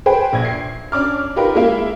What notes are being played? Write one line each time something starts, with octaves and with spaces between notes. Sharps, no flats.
G#4 B4 C5 G5
A#1 G#6
C7
C#4 D4 D6 F6
D#4 F4 G4 A#4 B4
G#3 A#3 E4